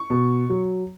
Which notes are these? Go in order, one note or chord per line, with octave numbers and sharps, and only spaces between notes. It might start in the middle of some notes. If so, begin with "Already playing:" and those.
Already playing: C#6
B2
F#3